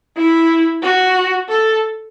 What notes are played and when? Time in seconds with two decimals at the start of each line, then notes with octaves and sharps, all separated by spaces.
0.17 E4
0.82 F#4
1.49 A4